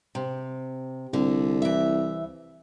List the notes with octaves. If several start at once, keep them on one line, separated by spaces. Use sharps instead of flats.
C3
C2 D3
E3 E5